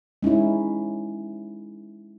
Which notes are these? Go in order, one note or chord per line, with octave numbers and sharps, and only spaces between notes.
G#3 C#4 D#4 E4